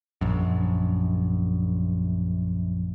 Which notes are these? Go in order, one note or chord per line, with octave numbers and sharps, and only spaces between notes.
A#1 F#2